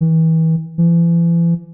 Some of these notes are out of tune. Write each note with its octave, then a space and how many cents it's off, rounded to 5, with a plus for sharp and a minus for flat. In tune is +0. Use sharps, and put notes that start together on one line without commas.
E3 -35
E3 +40